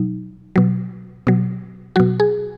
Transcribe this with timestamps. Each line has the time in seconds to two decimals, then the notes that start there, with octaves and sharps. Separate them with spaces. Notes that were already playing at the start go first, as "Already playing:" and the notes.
Already playing: B2 F#3 D#4
0.56 B2 F#3
1.27 B2 F#3
1.96 B2 F#3 F#4
2.20 G#4